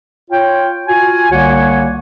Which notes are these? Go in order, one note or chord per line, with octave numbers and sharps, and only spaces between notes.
F4 C#5 G5
F4 F#4 G#5
C2 D3 A#3 C#5 F#5 G#5